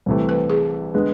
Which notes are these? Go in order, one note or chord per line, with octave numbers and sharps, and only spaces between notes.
C2 C3 E3 A3
B4
G#4
D3 G#3 B3